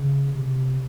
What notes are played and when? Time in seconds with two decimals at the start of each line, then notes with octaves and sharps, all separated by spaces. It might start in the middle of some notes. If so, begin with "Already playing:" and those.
Already playing: C#3
0.35 C3